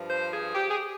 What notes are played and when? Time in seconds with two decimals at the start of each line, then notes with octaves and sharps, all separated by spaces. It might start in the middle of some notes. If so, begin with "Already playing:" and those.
Already playing: G2 F3
0.10 C5
0.32 G#4
0.55 G4
0.70 G#4
0.77 G4